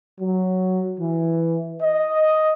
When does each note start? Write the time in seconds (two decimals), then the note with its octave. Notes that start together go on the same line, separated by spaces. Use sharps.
0.20 F#3
0.99 E3
1.81 D#5